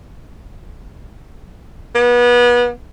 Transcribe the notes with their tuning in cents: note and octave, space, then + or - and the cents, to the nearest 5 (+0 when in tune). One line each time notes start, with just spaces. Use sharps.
B3 -30